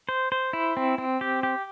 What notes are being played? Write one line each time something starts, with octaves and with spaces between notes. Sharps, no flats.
C5
C5
E4
C4
C4
G4
G4